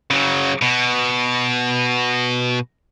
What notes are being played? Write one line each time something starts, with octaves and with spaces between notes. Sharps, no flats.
C#3 F#3
B2